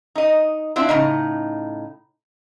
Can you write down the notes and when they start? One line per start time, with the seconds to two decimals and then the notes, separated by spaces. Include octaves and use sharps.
0.15 D#4 D#5
0.76 C4 D4 E4 F4
0.89 A2 C#3 D#4